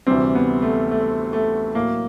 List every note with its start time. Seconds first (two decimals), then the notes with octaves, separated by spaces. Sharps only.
0.07 D2 C3 E3 G3 C4
0.35 B3
0.62 A3
0.91 A3
1.33 A3
1.75 A2 F#3 A#3